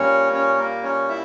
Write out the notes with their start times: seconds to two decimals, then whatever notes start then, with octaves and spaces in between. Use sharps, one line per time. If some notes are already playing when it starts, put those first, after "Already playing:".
Already playing: A#2 G3 C#4 C#5
0.33 C#4 C#5
0.58 A#3 A#4
0.83 C#4 C#5
1.09 E4 E5